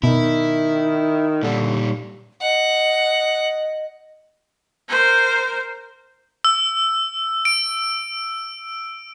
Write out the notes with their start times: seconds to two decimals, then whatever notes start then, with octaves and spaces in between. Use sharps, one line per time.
0.03 B2 D#3 E4
1.43 A#2 D3 G3
2.42 D#5 F#5
4.89 A#4 C5
6.44 E6
7.45 D7